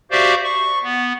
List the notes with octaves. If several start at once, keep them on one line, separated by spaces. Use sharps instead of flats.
F#4 G4 C5 D5 E5 F5
C#6
B3